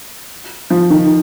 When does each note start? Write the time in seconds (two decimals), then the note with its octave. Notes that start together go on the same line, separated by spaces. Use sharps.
0.70 F3
0.90 D#3